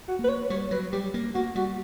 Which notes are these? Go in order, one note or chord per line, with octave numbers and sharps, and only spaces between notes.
F#4
A#3
B4
C#5
G3 C#5
F#3 B4
G3 G4
A#3
A#3 F#4
G3 F#4